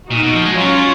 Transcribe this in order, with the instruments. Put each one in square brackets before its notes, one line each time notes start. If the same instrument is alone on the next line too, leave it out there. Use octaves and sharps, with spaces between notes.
[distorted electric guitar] A#2 [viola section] D#4 F#4
[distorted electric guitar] B2
F3
G#3
[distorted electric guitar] F#3 [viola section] C#4 F4